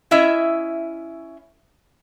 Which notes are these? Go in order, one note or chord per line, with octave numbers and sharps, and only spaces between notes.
C#4 E4 D#5 E5